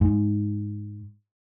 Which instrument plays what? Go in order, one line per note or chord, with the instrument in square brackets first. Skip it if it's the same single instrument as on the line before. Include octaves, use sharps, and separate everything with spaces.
[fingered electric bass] G#2